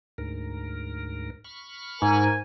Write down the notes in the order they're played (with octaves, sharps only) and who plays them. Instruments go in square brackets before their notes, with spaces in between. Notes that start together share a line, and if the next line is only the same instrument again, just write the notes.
[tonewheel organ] D2 G#2 A#4
B5 C#6 F6
[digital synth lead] G#2 [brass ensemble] A#4 G#5